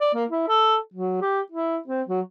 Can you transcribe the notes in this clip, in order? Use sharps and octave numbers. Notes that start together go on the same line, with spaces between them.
D5
A#3
E4
A4
F#3
G4
E4
C4
F#3